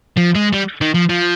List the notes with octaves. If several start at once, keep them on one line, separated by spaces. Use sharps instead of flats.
F3
G#3
G3
D#3
F3
F3